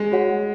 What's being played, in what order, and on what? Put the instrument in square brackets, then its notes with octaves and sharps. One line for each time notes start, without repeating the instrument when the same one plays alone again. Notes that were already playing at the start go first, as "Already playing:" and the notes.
Already playing: [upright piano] G#3
[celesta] F#4 C#5 F#5